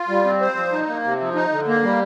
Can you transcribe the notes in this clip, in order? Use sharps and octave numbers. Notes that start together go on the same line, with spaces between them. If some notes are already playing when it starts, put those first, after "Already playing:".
Already playing: F4
G3
C4
C5
F3
D#4
A#3
C3
F3
D#4
D3
A#3
G3